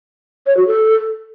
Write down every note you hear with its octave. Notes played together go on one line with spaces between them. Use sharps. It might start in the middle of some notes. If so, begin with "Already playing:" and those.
C#5
F#4
A4